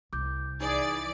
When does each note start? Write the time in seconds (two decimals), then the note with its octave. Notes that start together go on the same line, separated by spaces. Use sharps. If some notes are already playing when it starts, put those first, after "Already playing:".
0.13 C2 D6 G6
0.61 E3 D#4 G#4 D5 A6